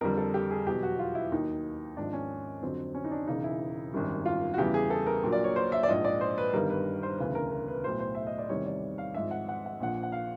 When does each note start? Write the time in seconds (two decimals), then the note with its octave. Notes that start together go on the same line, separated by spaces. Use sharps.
0.01 F2 D3 G3 A#4
0.17 A4
0.34 G4
0.50 G#4
0.66 E2 B2 F#3 G4
0.83 F#4
0.99 F4
1.15 E4
1.32 D#2 D#3 F#3 D#4
1.97 G#1 G#2 F3 D4
2.13 C#4
2.62 F2 D3 F#3 C4
2.95 C#4
3.04 D#4
3.11 D4
3.27 E1 E2 C#3 D#4
3.44 E4
3.93 G#1 F#2 D#3 G3
4.25 F4
4.54 F#4
4.58 E2 C#3 E3 G3 G4
4.74 G#4
4.90 A4
5.07 A#4
5.24 A#1 A#2 F#3
5.32 D5
5.44 C#5
5.56 C5
5.72 E5
5.83 D5
5.88 A#1 G#2 F3 D#5
6.04 D5
6.21 C5
6.38 B4
6.54 G1 G2 D#3 G3 A#4
6.70 B4
7.03 C5
7.19 E1 D2 C#3 E3 B4
7.35 A#4
7.52 A#4
7.68 B4
7.84 B1 A2 F#3 C5
8.00 C5
8.15 E5
8.27 D#5
8.38 D5
8.49 E2 C3 D#3 G3 C#5
8.66 D5
8.98 F5
9.14 G#1 G#2 F3 E5
9.31 F#5
9.49 F#5
9.66 F#5
9.80 A#1 A#2 F3 F#5
10.03 F#5
10.12 F5